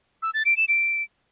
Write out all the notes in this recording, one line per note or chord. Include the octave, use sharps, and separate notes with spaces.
E6
A6
D7
E7
D7